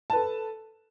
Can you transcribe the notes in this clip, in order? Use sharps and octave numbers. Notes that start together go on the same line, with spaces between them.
A4 B4 A5